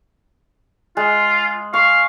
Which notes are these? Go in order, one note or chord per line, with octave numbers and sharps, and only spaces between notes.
G#3 F4
F5 C#6